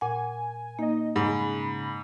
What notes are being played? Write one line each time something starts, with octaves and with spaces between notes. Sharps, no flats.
A#2 F#5 G#5
A#3 D#4 D#5
G#2 C#3 B5